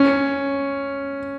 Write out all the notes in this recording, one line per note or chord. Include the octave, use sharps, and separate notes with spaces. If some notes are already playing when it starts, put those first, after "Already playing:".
Already playing: C#4